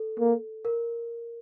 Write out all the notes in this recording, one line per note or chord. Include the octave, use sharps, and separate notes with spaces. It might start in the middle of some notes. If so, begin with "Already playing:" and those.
Already playing: A4
A#3
A#4